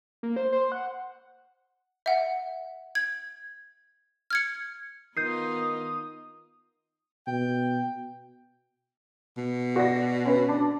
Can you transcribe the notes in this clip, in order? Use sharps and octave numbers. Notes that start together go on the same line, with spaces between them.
A#3
C5
C5
F#5
E5 F#5
G#6
F6 G#6 C#7
D#3 B3 D#4 F4 D#6 G6 C7
B2 G5
B2
F#4 D5 A#6
C#4 B4
D4